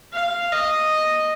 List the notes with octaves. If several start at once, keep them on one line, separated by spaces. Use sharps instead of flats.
F5
D#5